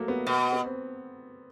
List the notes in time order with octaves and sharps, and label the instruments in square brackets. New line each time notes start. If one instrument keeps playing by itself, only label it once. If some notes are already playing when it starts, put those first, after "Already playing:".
Already playing: [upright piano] F#3 A3 A#3
B3
[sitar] B2
[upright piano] B3
C4